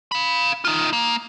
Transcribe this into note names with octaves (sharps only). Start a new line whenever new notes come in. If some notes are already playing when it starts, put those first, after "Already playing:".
F5 B5
D#4 F4
A#3